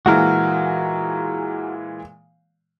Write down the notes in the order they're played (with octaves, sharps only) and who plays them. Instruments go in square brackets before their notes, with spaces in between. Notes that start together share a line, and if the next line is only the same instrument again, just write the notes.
[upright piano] A#2 E3 G#3 [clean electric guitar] F#4 A#4